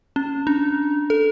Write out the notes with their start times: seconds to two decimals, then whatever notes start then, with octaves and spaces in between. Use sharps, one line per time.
0.16 C#4
0.47 D4
1.10 A4